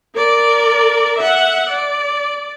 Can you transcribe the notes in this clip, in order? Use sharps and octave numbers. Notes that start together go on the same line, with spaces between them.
A#4 D5
E5 F#5
D5